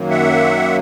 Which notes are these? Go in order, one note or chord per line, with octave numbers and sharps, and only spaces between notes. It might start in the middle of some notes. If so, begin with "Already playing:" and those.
Already playing: F#2 D#3 F#3 A#3
E5 F#5